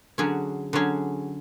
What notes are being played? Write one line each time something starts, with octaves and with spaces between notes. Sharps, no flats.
D3 F#3 C#4 G#4
D3 F#3 C#4 G#4